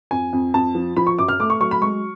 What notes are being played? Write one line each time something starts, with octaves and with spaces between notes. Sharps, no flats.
F2 G#5
F2
F2 A5
F3
F3 B5
C#6
F#2 D6
F6
A3 D6
C#6
F#3 C#6
B5
G#3 C#6